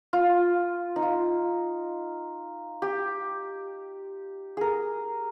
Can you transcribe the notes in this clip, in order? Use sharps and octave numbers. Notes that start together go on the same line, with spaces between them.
F4
D#4
F4
G4
G#4 A#4